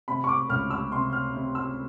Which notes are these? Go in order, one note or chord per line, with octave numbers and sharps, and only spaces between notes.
C3 B5
C#6
D6
C#2 F6
E6
C3 C6
F6
C3
E6